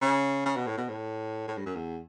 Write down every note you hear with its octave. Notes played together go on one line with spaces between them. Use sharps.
C#3
C#3
B2
A2
B2
A2
A2
G2
F#2
E2